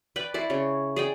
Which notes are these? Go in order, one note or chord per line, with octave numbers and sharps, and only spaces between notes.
B4 D5 G5
E4 C5 D5
C#3 C#5
G#4 D5 G5